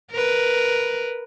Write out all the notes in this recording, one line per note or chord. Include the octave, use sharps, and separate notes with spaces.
A#4 B4